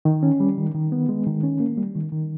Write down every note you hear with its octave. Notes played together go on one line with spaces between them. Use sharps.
D#3
C#4
G3
D#3
D#3
B3
G#3
D#3
C#4
A#3
G3
D#3
D#3